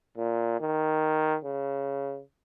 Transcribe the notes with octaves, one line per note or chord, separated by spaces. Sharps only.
A#2
D#3
C#3